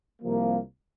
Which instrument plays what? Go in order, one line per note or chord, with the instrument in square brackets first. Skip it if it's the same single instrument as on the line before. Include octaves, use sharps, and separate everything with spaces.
[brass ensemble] C2 C3 F3 A#3